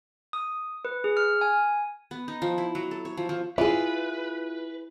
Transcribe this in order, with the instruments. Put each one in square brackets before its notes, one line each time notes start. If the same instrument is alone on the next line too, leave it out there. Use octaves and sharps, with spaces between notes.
[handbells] D#6
B4
G#4
F6
G#5
[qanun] B3
D#4
F3
E4
F#3
A4
C#5
F3
F3
[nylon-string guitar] E4 G#4 [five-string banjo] F4 [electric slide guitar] B4